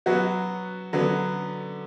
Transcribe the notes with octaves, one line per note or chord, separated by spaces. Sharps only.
F#3 B3 F#4
D3 F#3 B3